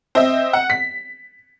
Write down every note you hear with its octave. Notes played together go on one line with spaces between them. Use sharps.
C4 D#5 E5
F#5
B6